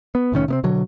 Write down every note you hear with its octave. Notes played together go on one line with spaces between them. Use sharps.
B3
C2 A2 D#3 C#4
C3 B3 C4
B2 D3 F#3